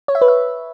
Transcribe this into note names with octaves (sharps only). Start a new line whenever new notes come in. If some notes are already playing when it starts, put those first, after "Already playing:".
C#5
E5
B4
E5